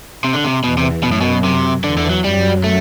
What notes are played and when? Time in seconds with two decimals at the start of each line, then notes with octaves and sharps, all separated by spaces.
0.24 C3
0.34 D3
0.44 C3
0.64 E2 B2 E3
0.77 C3
1.03 F#2 B2 F#3
1.12 A2
1.21 B2
1.44 C3
1.84 E2 D3 E3
1.97 D3
2.10 F#3
2.24 F#2 F#3 G3
2.64 A3